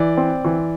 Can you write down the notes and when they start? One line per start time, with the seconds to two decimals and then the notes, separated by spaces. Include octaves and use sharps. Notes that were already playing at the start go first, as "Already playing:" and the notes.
Already playing: E3 D5
0.17 C4
0.45 E3